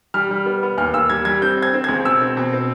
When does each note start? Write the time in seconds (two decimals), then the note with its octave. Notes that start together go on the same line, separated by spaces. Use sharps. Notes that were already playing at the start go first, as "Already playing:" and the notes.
0.14 G3 F6
0.31 G3
0.46 B3
0.63 B3
0.78 D#2 F6
0.93 D#2 E6
1.10 G3 G#6
1.25 G3 G#6
1.42 C4 G6
1.57 C4
1.63 G#6
1.74 C4
1.84 C#2 G#6
2.05 B2 E6
2.21 C4
2.37 B2
2.53 C4